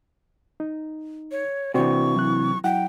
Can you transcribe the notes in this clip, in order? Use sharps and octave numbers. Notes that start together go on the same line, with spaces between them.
D#4
C#5
C3 E3 F#4 C5 D5 C#6
F#3 E4 F#6
F#3 E4 F#5 G5